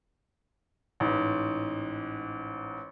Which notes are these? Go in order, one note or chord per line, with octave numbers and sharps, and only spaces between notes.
A1 G#2